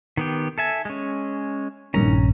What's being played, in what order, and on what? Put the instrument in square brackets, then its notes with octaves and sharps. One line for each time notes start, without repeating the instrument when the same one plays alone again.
[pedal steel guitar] D#3 B3 G4
A4 E5 G#5
G#3 C#4
[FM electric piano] A#1 G2 D#3 [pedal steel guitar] C#4 A#5